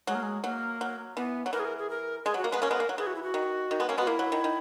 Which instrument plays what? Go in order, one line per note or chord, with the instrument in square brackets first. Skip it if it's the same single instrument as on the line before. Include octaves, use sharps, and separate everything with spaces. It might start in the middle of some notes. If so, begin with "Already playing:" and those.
[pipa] F#3 [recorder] G#3
[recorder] A#3
G#3
[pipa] F#3 [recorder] A#3
[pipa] F#3
[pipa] E3 [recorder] B3
[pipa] F#3
[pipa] E3 [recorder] A#4
[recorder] G#4
A#4
G#4
A#4
[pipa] G#3 [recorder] G#4
[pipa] F#3
[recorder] F#4
[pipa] A#3
[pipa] G#3 B3 [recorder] B4
[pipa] A#3 C#4 [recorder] A#4
[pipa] G#3 B3
A#3
F#3
[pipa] E3 [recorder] G#4
[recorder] F#4
E4
F#4
[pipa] D#3
D#3
G#3 B3
A#3 C#4
[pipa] G#3 B3 [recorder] F#4
[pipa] A#3 [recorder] E4
[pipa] F#3
D#3
D#3